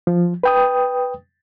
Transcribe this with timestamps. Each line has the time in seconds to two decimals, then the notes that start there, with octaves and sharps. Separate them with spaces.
0.07 F3
0.43 B4 G5 D#6